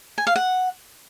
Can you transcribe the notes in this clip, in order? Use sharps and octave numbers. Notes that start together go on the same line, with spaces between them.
G#5
F5
F#5